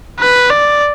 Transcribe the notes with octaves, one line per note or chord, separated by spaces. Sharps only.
B4
D5